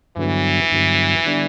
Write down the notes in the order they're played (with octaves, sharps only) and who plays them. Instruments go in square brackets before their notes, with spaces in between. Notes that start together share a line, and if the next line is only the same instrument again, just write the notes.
[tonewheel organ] G2 D3 F#3 B3 [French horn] E3
[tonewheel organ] G2 D3 F#3 B3
D3 G3 B3 D4